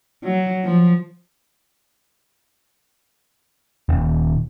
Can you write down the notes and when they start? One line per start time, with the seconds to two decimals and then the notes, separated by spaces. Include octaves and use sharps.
0.24 F#3
0.64 F3
3.89 D#1